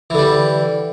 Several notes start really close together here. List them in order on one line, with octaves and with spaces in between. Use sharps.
E3 D3 G3